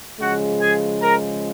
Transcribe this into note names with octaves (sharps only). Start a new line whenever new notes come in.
C#3 F3 G#3 F#4 F#5
G#4 G#5
A#4 A#5